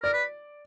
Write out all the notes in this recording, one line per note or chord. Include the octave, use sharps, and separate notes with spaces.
A#4 D5
B4